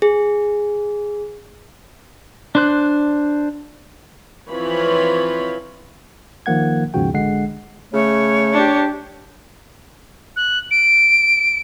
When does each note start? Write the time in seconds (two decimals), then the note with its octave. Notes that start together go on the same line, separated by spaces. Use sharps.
0.02 G#4
2.55 D4 C5 F#6
4.50 E3 F3 C4 F4 C#5 B5
6.46 D#3 F3 A#3 F#5 G#6
6.94 D#2 G#2 C#3 F3 F#4 G5
7.14 A1 D3 G#3 F#5 C7
7.93 C#3 A3 C#5
8.53 D4 G4
10.36 F#6
10.71 D7